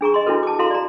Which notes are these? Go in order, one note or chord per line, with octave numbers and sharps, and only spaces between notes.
D4 G#4 A#5 C#6
D#5 C6
D4 E4 F#4 A4 B4
A5 D6
E4 F#4 A4 F5 A#5 C6
D5 A#5